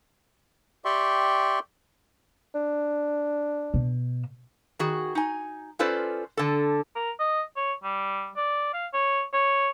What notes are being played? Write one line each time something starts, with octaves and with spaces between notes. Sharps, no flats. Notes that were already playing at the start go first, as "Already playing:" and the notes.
G4 D5 E5 G5 C6 C#6
D4
B2
D#3 F#4 G#4
D#4 G#5
C#4 F4 A4 B4 C5 D5
D3 A4
A#4
D#5
C#5
G3
D5
F5
C#5
C#5